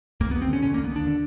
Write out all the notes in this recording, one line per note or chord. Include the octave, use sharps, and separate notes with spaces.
D#2 A#3
B3
D#2
C4
D3 C#4
D3 C#4
A#3
D#2
B3
D#2 D4
D3